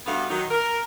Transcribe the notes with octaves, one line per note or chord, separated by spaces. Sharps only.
G2 G3 A3 B3 F#4 F5
D#3 F#3 D#4
A#4